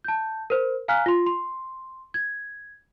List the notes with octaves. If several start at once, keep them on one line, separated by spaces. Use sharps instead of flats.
A5 G6
A#4 C5
F5 G#5 A#5 F6 F#6 B6
F4 C6
C6
G#6